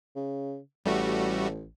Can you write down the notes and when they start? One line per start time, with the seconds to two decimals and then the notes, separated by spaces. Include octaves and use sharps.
0.16 C#3
0.86 A1 G3 A3 F#4